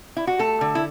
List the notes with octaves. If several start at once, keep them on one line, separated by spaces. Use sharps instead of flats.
E4
F#4
A3 A4
D3
E4